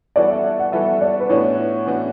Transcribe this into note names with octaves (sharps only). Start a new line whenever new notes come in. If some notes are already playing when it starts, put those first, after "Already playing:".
E3 G3 B3 F#4 A4 D5
E5
F#5
E3 G3 B3 F#4 A4 E5
D5
B4
A2 E3 B3 D4 F#4 C#5
A2 E3 B3 D4 F#4